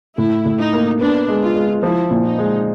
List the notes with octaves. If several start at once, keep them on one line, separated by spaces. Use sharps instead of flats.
A2 E4
A2
D#4
A#3
B3 D4
G#3
F4
G#3
F3 E4
A#2
D#4
G#3